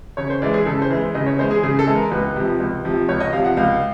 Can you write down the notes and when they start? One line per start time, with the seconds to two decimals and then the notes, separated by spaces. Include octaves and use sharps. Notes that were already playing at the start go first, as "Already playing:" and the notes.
0.17 C#3 C#5
0.30 C5
0.42 E3 G#3 D5
0.54 G#4
0.66 C#3 A4
0.82 C5
0.90 E3 G#3
1.15 C#3 D#5
1.26 C#5
1.39 E3 G#3 C5
1.51 G#4
1.63 C#3 G#4
1.79 A4
1.87 E3 G#3
1.95 A#4
2.11 C#2 B4
2.36 C3 F3
2.60 C#2
2.85 C3 F3
3.09 C#2 C#5
3.20 D#5
3.33 C3 F3 F5
3.44 F#5
3.57 C#2 F5